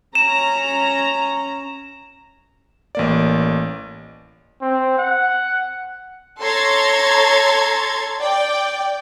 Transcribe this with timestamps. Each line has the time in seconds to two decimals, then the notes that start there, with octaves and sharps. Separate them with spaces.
0.15 C#4 A#5 E7
2.95 A1 A#3 D5
4.61 C4
4.98 F#5
6.40 A4 C#5 A#5 C6 G#6 A6
8.21 D5 G5